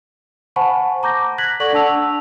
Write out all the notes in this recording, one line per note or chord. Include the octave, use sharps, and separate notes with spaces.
C5 F#5 G#5 A5 B5 C#6
A#5 D6 G6 A#6
F#6 G#6 A#6 B6 F#7
A4 D5 F#5 C#6 F#7
D4 F#5 A5 E6 F7